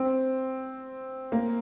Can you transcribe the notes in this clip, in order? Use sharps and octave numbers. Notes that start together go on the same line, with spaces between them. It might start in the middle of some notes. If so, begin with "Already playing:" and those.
Already playing: C4
A#3